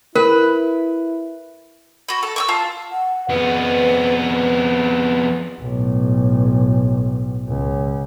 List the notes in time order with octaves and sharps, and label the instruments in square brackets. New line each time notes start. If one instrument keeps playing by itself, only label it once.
[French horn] E4 [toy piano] A#4 [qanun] B4
[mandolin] F#4 B5
A4
C#6 D6 E6
F4 F5 A5
[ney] F#5
[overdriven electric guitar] F2 B3 [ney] B4
[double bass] B1 A2
C#2